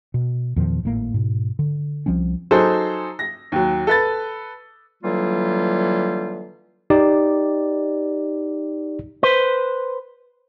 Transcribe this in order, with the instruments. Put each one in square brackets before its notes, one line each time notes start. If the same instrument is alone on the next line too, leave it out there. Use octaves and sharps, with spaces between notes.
[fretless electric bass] B2
E2 A#2 D#3 F3
G#1 A2 A#3
G#2 B2
D3
C2 F3 C4 C#4
[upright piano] F#3 D#4 G#4 A4 C5
A#6
D#2 F#3
A4 B4 A6
[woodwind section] D3 E3 F#3 G3 A#3 F4
[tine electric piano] D#4 G4 D5
[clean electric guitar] B4 C5